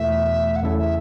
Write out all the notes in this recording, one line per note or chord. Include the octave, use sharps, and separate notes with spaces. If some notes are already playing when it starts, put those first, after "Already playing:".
Already playing: E2 B2 A3 E4 E5
F#5
E2 C#3 A3 E4 A4 E5
E5